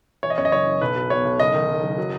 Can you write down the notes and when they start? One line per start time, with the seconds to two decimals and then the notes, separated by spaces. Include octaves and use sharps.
0.23 E3 C#5
0.30 D#5
0.38 F#2 C#5
0.45 D#5
0.52 F#1 C#5
0.66 F#1
0.81 B1 B4
0.96 F#3
1.10 B2 C#5
1.25 B1
1.39 F#1 D#5
1.54 D#3
1.69 F#1
1.83 F#1
1.98 F#3